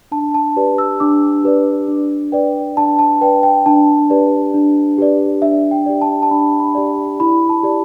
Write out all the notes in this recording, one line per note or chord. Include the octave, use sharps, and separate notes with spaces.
D4 A5
A5
G4 B4 D5
E6
D4 D6
G4 B4 D5
D4
B4 D5 G5
D4 A5
A5
B4 D5 G5
G5
D4 A5
G4 B4 D5
D4
G4 B4 D5
D4 E5
G5
G4 D5
A5
A5
D4 B5
B5
G4 D5
E4 B5
A5
G4 D5